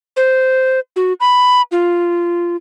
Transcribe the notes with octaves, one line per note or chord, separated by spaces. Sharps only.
C5
F#4
B5
F4